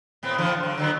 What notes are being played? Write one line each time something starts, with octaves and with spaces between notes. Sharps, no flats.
A2 B3 C4
D3 E3 F3
D3 F#3
D3 F#3 B3